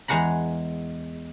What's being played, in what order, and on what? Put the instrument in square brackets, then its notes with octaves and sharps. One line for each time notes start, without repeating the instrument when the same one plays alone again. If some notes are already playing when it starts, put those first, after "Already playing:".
[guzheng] E2 G#3 F#5 A#5 B5